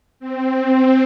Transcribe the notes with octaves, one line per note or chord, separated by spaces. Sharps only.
C4